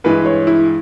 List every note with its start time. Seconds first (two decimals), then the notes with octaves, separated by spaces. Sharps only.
0.04 G2 E3 G#3 B4
0.26 C#5
0.47 E4